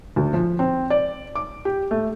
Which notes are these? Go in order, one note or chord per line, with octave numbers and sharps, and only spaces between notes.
D2
F3
C4
D5
D6
G4
A3